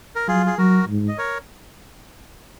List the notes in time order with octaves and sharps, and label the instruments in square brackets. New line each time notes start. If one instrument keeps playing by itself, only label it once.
[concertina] A#4
[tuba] F#3 [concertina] F4 G#4
[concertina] G#4
[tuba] F#3 [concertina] F#4 A#4
[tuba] G#2
[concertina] D#5
A#4 C#5